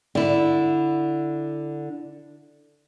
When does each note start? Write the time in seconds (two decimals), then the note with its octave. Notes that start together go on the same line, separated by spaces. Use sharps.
0.15 D3 E4